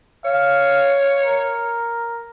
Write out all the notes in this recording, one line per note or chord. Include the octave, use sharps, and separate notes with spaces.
C#5 F5
A#4